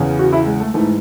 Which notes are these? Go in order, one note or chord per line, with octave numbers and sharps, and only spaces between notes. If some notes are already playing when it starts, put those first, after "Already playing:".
Already playing: E2 C#3 E3
F#4
E4
G#3
A3
G#2 E3 A3